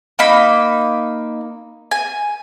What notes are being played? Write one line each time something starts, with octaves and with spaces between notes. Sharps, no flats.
A#3 D#4 B5
G#5